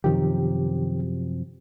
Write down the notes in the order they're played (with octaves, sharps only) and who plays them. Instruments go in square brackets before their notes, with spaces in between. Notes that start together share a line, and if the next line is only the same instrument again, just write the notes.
[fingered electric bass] F#2 C3 F3 [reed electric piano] D#3 G4